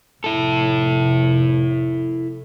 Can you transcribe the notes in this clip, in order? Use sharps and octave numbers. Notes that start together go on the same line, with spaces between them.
F1 E4 A4